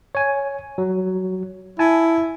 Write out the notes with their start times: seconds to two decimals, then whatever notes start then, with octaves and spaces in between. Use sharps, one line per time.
0.15 C#5 G#5
0.78 F#3
1.79 E4 G#5 A5